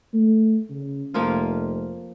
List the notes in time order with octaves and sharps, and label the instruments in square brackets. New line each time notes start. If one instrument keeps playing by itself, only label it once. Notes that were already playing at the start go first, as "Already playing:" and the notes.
[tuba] A3
C#3
[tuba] F1 [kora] F3 A#3 F4